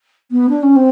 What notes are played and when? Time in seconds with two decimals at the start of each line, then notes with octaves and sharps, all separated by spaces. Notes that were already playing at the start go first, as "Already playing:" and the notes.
0.31 B3
0.49 D4
0.62 C#4
0.76 C4